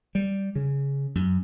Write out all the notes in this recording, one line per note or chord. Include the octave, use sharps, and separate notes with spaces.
G3
C#3
F#2